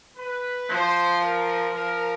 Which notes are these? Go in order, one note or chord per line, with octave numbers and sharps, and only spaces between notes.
B4
F3 C5
A#4
F3 A#4